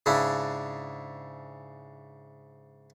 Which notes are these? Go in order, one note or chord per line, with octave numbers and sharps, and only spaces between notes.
G#2 C#3 D4 E4